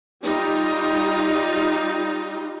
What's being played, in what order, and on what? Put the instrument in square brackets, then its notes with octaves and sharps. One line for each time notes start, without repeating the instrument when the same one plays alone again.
[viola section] G3 D#4 F4 G4